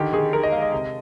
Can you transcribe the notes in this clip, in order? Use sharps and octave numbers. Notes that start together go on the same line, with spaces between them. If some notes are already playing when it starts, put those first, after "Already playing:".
Already playing: D3 D#3 G4
D#3 G#4
D#3 A#4
D#5
G#3 F5
D#5
C3